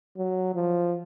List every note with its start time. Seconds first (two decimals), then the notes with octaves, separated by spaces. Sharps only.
0.17 F#3
0.55 F3